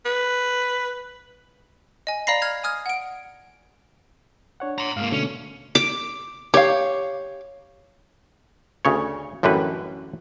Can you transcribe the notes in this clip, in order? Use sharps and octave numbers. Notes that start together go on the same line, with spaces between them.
B4
D#5 G#5
D5 F5 A#5 B5 A#6 C7
F6 G#6 F7
G#5 D#6 F6 G#6
F#5 D7
D4 C#5 F#5
A#5 C6
G#2 A#3 F5
B2 D3 A3 C#4
D6
G4 C#5 F5
D2 C#3 C#5
A1 F#2 D3 G3 B4